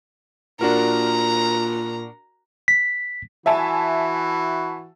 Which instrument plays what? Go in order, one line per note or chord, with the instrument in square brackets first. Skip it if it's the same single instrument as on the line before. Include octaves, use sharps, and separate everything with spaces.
[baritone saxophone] A#2 [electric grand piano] D4 F#4 A#4 [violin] A#5
[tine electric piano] B6
[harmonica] E3 F#4 [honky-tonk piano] E5 G#5 A5